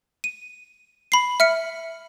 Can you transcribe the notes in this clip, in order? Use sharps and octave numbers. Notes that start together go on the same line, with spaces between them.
D#7
B5 C7
E5 F6 C#7